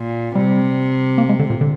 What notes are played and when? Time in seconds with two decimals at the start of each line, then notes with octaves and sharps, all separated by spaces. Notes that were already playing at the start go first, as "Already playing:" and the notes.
Already playing: A#2
0.35 C3 G3
1.18 A#3
1.29 G#3
1.39 D3
1.50 A#2
1.61 D3